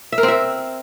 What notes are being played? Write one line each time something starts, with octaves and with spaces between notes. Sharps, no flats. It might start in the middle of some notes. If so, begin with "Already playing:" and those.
E5
A#4
C4
E5